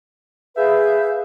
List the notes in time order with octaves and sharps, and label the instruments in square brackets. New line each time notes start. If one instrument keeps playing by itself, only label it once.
[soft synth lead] G#4 [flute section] B4 F5 G6 [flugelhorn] E5